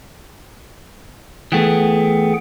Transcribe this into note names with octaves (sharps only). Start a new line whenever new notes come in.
E3 A3 B3 G#4 F#5 G5